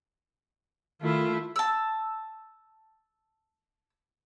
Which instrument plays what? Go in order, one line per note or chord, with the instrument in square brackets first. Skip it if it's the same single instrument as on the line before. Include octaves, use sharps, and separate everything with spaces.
[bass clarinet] D#3 [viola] A3 E4 [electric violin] F4
[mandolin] A5 E6